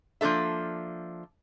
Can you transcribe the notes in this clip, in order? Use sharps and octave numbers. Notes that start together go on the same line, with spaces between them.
F3 A#3 D4 A4 E5